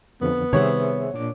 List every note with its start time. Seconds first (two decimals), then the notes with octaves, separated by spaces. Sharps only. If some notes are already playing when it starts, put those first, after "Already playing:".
0.21 F2 D3 F3 B3
0.53 C3 D#3 G3 G#4 C5 C#5 E5 F#5
1.14 A#2 D4 D6